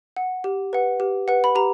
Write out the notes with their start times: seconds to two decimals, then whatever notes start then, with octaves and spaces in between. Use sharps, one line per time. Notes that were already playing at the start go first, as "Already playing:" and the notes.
0.17 F#5
0.44 G4
0.73 B4 F#5
1.00 G4
1.28 B4 F#5
1.44 B5
1.55 G4 A#5